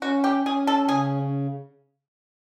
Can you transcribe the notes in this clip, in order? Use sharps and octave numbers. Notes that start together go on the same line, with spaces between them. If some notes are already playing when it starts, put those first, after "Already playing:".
C#4 F#4
G4
C#4 G#4
A4
C#3 G#4